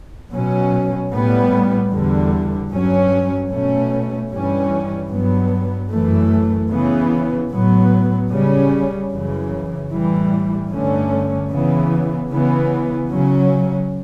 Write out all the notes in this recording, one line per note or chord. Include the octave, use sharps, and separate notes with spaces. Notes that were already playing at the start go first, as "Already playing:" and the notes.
B2 F#3 C#4
A2 G3 B3
E2 D3 G3
G2 F#3 C#4
B2 A3 C#4
G2 E3 G3 C#4
G2 F#3 B3
F#2 E3 A3
C#3 E3 B3
A2 F#3 B3
C#3 G3 C#4
F#2 C#3 E3
A2 E3 G3
G2 D3 A3 C#4
C#3 E3 B3
C#3 E3 B3
C#3 F#3 C#4